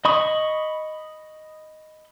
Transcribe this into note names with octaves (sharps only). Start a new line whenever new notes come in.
D#5 B5 C#6 D#6